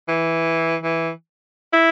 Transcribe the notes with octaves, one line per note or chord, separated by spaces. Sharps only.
E3
E3
E4